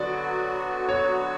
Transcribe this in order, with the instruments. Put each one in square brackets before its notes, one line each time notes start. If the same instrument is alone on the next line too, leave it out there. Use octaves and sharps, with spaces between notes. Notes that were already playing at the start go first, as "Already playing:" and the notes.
Already playing: [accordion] D3 F#3 B3 F#4 [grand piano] D5
[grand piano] C#5